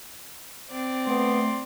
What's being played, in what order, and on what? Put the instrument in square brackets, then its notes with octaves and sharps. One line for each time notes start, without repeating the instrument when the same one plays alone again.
[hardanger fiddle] C4 D5
[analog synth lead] A3 [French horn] B3 [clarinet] C6